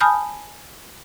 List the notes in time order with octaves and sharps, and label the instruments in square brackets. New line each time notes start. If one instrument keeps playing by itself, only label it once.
[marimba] G#5 A5 B5 D#6 F6 G6